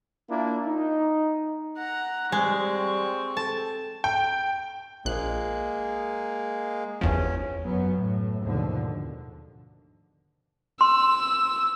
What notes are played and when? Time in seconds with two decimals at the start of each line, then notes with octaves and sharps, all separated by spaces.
0.30 A#3 D4 E4 F4
0.67 D#4
1.77 F#5 A#5
2.32 G3 G#3 C4 C#6
3.37 A4 A5
4.04 G5
5.05 A#1 G#3 A#3 F#6
7.01 G1 E2 F3 C#4
7.65 F#2 F#3 B3
7.97 A2
8.42 D#2 G#2 B2 D3 F3
10.81 C6 E6